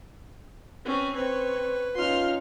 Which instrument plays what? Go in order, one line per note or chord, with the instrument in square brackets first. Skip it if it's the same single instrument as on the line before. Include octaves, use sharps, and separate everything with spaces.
[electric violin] C4 B4 [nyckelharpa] C#4
[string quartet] C4 [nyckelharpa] B4 [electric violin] C#5
[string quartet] C#4 D#4 [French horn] F4 [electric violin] C6 F6